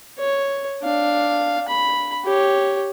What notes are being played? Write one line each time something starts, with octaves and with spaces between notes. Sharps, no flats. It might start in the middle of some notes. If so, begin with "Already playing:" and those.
C#5
D4 F5
B5
G4 C#5